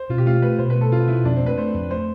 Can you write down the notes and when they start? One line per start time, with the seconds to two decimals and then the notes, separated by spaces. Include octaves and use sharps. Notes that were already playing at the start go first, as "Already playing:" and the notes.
Already playing: C5
0.10 B2 F4
0.18 G4
0.26 A3 F4
0.42 A3 B4
0.59 B2 C5
0.70 B4
0.75 A3
0.81 A4
0.92 B2 F4
1.08 B2 E4
1.25 F2 D4
1.36 C4
1.41 A3
1.46 B4
1.57 A3 C5
1.74 F2
1.90 A3 C5